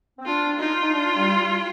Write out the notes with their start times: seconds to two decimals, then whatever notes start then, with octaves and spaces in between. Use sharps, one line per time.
0.18 C4
0.26 D4 F4
0.59 D#4 F4
0.82 D#4
0.93 D4
1.16 G3
1.38 G3